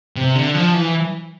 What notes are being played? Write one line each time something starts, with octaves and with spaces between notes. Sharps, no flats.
C3
D3
F3
E3